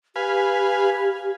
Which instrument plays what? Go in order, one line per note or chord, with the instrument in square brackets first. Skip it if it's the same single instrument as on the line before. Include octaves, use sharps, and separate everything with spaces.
[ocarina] G4 [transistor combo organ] B4 F5 G#5